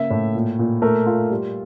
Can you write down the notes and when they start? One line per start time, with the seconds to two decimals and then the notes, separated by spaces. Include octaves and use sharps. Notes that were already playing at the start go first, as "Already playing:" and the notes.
Already playing: C#3 A#3 E5
0.10 A2
0.35 A#2
0.59 A#2
0.82 A3 A#4
1.07 F4
1.31 G3